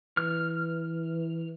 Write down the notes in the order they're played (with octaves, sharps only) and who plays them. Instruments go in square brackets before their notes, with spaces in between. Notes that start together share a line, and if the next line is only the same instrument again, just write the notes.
[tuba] E3 [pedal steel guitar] F6